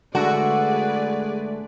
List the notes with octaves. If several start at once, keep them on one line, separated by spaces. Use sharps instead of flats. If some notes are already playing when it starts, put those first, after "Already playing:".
D3 G#3 A3 F#4 G#4 B4 D5